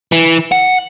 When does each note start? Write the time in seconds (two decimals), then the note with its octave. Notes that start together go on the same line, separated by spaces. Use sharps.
0.12 E3
0.52 F#5